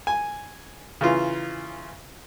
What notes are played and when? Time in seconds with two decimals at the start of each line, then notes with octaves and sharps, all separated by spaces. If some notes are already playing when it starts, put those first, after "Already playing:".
0.07 G#5
1.01 C#3 E3 F4